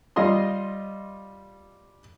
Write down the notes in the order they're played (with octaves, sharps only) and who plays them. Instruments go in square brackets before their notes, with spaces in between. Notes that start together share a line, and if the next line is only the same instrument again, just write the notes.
[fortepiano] G3 F4 D#5 C6 D#6